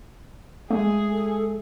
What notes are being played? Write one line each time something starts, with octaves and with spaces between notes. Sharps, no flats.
G#3 A3 G#4 E5
A4